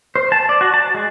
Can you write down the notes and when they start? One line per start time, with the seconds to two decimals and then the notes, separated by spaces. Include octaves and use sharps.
0.16 C5
0.32 A5
0.49 D5
0.61 F#4
0.74 A5
0.95 G#3